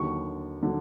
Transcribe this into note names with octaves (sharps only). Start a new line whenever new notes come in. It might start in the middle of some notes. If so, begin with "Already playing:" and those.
Already playing: D#2 D3 F#3 C#6
D3 F#3